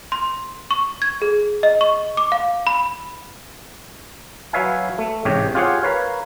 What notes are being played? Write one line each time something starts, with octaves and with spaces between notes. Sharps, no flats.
C6
C#6
G#6
G#4
D#5
C#6
D6
F5
B5
F#3 B4 C#5 E5 F5 G#5
A3
A1 G#2 C3 G4 C#5
F4 G4 G#4 C#5 F5 F#5
A#4 B4 C#5 F5